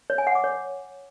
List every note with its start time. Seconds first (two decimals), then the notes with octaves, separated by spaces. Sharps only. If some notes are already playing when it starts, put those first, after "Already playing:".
0.10 C#5
0.18 G#5
0.27 F#5
0.35 D6
0.44 C#5